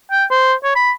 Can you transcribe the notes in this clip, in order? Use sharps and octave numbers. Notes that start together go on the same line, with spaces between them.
G5
C5
C#5
B5